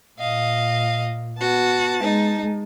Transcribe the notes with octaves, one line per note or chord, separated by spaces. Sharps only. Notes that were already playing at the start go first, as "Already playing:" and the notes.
A#2 D#5 F5
B3 F#4 A5
G#3 D#4